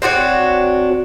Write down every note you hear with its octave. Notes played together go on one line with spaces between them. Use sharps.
C4 D4 F#4 C#5